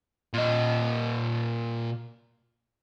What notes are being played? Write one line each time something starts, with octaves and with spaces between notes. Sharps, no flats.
A#2 D#5